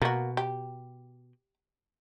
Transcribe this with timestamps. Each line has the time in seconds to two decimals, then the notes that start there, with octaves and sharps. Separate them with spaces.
0.02 B2 A#3 F#4
0.37 G4